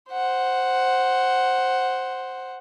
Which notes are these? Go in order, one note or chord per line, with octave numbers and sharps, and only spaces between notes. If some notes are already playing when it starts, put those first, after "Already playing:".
C5 F#5